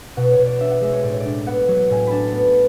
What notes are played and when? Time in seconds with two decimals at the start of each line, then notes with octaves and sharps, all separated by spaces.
0.17 B2 F#5
0.31 C#5
0.38 B2
0.45 D5
0.60 D4 E5
0.71 F#5
0.81 G#3 E5
0.93 C#5
1.03 A2 D5
1.12 C#5
1.20 D4 D5
1.46 B3 F#5
1.68 F#3
1.90 A2 G#5
2.07 D4 A5 B5
2.32 B3